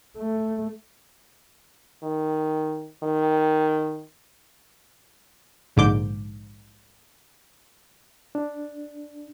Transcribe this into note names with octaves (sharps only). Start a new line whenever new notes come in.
A3
D#3
D#3
A#1 G#2 D3 D6 G6
D4